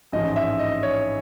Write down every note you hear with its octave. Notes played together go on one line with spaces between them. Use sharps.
A1 G#2 F3 D#5
E5
D#5
C#5